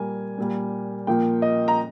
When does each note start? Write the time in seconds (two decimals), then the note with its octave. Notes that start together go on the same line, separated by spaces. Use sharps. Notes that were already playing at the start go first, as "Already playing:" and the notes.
Already playing: A#2 G3 A#3 G#5
0.38 A#2 G3 A#3
1.07 A#2 F3 A#3 G5
1.42 D#5
1.68 A#5